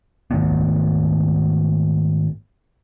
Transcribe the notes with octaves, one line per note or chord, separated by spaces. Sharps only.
G#2 D#3 A3 B3